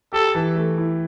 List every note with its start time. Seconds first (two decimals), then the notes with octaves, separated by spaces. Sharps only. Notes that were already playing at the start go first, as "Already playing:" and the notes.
0.13 G4 A4
0.35 E3
0.56 A3
0.78 E4